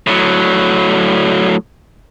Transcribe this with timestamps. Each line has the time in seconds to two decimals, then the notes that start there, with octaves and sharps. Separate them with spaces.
0.07 A2 F#3